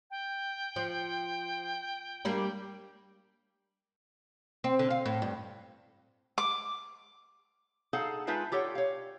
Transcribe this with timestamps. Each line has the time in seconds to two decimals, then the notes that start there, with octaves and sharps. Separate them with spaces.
0.11 G5
0.76 F3
2.25 G3 A#3 D4
4.64 C4
4.79 D3
4.90 F5
5.06 A2
5.22 G2
6.38 D6
7.93 D#4 G#4 A4 F5 F#5
8.27 G#3 D#4 F4 B4 E5 A5
8.52 F4 G4 A4 C#5 F#5 G5
8.75 C#5 F5